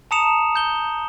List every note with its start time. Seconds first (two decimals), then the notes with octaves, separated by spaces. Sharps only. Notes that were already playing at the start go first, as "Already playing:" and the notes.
0.11 A5 A#5 D#6 C#7 E7 F7
0.56 G6 G7